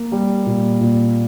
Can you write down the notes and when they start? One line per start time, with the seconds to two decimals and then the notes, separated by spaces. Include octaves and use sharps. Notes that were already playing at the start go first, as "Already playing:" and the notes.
Already playing: A#3
0.12 G3
0.46 A#2
0.80 A#2